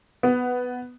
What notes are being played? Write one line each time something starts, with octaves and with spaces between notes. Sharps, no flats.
B3